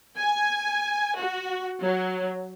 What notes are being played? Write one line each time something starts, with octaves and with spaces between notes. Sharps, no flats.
G#5
F#4
F#3